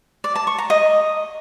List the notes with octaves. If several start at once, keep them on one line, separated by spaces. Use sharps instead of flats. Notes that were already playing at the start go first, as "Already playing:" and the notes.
D5
A5
C#6
A#5
D#5